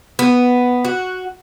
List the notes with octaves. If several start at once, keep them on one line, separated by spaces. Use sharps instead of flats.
B3
F#4